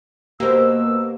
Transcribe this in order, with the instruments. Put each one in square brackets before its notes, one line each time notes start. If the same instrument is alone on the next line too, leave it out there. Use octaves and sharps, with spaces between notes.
[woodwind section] B2 E6 [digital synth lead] A#3 [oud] G4 C5